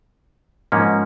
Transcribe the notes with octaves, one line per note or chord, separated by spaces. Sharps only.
G#2 F3 A#3 C#4